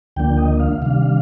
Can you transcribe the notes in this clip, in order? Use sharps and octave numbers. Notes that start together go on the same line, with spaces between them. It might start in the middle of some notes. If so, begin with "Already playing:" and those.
D2 D3 F3 A#3 D4 G5
D#5
F5
C3 D#3 G3 D4 F5